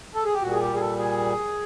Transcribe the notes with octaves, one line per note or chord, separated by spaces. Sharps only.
A4
G#4
G4
A#2 G3 F#4
G#4
G4
G#4
A4
G#4